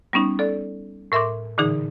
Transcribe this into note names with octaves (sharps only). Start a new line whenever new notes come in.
G3 B3 C#4 D#4
A4 D5
A2 A#4 E5 C6 D6
A#2 D3 E3 D#4 G#4